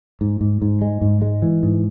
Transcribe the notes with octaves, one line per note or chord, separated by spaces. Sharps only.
G#2
G#2
G#2
G#3
G#2
G#3
E3
G#2